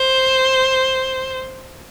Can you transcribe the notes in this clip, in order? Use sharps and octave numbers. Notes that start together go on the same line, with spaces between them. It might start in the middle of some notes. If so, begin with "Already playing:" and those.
Already playing: C5